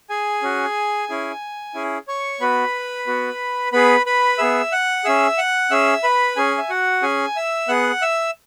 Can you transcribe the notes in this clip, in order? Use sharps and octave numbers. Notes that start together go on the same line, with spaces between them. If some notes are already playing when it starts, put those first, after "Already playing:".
G#4 G#5
C#4 F#4
C#4 E4 G#4
C#4 E4 G#4
C#5 C#6
B3 F#4 B4 B5
B3 F#4
B3 G#4 B4 B5
B4 B5
B3 G#4 E5 E6
F#5 F#6
C#4 G#4 E5 E6
F#5 F#6
C#4 G#4 E5 E6
B4 B5
C#4 G#4 G#5
E5
F#4 F#5
C#4 G#4 G#5
E5 E6
B3 G#4 F#5 F#6
E5 E6